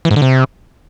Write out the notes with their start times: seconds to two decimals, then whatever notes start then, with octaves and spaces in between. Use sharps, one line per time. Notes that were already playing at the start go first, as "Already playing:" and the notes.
0.05 E3
0.11 G#2
0.16 D3
0.22 C3